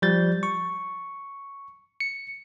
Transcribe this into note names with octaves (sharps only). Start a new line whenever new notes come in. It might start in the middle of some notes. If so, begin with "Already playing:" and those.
F3 G3 G6 A6
C#6
C#7